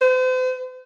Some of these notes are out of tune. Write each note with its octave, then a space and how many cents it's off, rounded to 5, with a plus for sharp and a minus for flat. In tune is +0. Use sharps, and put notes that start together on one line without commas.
C5 -40